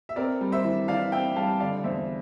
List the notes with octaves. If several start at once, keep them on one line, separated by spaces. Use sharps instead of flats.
E5
C4 A#4 D5
G3
C5 E5
E3
E3 D5 F5
C4 E5 G5
G3 F5 A5
D3 D5 F5
D5
E2 C5 E5